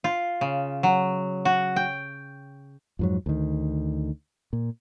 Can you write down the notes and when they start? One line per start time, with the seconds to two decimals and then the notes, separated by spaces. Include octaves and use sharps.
0.04 F4
0.41 C#3
0.83 F#3
1.45 F#4
1.76 G5
2.99 F2 G#2 F#3
3.26 D2 D#3
4.53 A#2